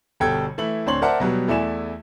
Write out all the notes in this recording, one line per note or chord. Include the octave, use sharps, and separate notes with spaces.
G1 B2 G3 A4 G5 G#6
E3 A3 E4 F#7
D1 C4 D4 C#5 C6 F#7
A#4 C5 D5 E5 F#5 A5
B2 F#3 G3 B3
E2 A3 E4 D5 G#5 E7